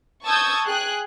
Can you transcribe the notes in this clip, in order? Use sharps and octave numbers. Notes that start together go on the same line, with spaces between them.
A5 C#6 D#6 E6 G6 G#6
G#4 G5 F#6